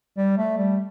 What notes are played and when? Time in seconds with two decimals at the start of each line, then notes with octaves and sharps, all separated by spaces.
0.17 G3
0.38 A3
0.58 G3